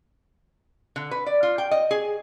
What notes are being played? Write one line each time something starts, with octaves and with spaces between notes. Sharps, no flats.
D3
B4
D5
F4
G5
D#5
G#4